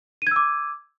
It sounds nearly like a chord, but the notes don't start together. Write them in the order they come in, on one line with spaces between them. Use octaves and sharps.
D#7 G#6 E6 D6